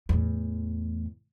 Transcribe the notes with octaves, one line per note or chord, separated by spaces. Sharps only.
E2 A2